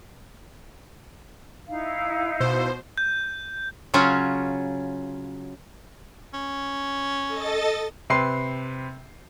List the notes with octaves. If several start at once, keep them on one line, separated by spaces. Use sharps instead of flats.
D#4 E4 F5
B2 C5
G6
C#3 F#3 C#4 F4
C#4
A4 D#5 A6
C3 C4 B4 C6 C7